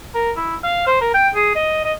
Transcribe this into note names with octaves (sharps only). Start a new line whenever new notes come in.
A#4
E4
F5
C5
A#4
G5
G#4
D#5
D#5